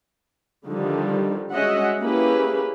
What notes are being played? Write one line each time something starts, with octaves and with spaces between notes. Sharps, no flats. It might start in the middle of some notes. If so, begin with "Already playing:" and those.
D3 D#3 F3 G3
G#3 C#4 F#4 D#5 E5 F#5
A#3 C#4 E4 G4 G#4 B4